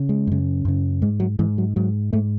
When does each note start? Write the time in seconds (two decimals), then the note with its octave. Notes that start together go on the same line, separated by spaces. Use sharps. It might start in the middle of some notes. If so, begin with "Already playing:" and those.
Already playing: C#3
0.09 G#3
0.27 F#2 C#3
0.65 F#2 C#3
1.02 G#2 G#3
1.20 F#3
1.39 G#2 E3
1.58 F#3
1.76 G#2 F#3
2.13 G#2 A3